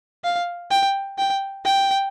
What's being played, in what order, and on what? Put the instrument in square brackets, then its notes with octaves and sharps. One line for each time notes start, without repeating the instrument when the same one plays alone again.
[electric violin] F5
G5
G5
G5